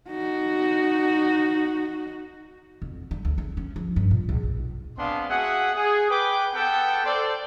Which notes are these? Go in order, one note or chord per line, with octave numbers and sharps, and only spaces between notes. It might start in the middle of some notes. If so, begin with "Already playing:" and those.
D#4 F#4
F2
G3
D2
C4
C#4
F3
G2
A#2
C#2
B1
G#3 B3 C4 D4 F5 C6
F#4 G#4 E5 F#5
G#4
B4 G5 D6
B3 A4 F#5 G5
A4 C5 D5